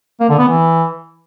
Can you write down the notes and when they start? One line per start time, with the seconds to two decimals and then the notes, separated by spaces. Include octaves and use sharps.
0.20 A#3
0.30 D3
0.39 B3
0.48 E3